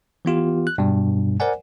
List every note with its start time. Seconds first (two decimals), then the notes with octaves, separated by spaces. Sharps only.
0.25 E3 B3 F4 G4
0.67 F#6
0.78 G2 B2 G3
1.40 A#4 C5 D5 F#5 G#5